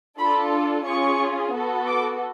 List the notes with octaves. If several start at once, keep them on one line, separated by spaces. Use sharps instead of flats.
D4 F4 A4 B5
C#4 F4 G#4 C#6
B3 F#4 A4
D6